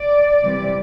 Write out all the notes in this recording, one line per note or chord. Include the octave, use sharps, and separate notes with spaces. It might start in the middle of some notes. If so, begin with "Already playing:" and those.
Already playing: D5
C3 E3 G3